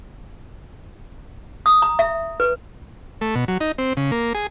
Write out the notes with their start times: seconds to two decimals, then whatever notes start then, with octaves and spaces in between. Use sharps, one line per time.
1.66 D#6
1.82 A#5
1.99 E5
2.40 B4
3.21 A3
3.35 B2
3.48 F#3
3.61 D#4
3.78 C4
3.97 C#3
4.12 A#3
4.35 G#4